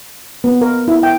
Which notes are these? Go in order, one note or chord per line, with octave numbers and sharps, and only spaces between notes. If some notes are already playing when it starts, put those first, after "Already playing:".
B3
A#4
E4
G5